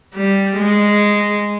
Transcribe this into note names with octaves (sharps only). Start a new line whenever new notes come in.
G3
G#3